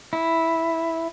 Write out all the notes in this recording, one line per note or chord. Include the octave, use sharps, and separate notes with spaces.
E4